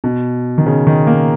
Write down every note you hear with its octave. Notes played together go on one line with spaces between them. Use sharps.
B2
D#3
C#3
D#3
A#3